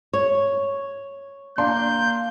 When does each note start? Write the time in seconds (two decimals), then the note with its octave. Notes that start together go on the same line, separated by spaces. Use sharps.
0.13 C#5
1.58 A#3 D4 C6 G6